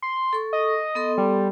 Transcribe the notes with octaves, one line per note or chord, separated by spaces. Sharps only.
C6
A4 C#6
D#5
B3 A4 C6
G3